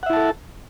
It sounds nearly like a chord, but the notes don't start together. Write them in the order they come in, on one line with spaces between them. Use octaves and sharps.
F#5 E5 E4 A5 A4